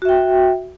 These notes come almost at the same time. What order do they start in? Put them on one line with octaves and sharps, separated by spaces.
F#4 E5 G5